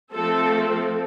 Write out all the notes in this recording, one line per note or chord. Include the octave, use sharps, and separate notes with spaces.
F3 A3 C4 A4